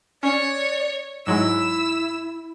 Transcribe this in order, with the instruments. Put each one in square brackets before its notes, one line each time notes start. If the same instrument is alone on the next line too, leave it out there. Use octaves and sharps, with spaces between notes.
[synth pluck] C#4 [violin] C#5 [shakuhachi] D5
[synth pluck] G#2 F#3 G#3 [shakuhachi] E4 [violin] E6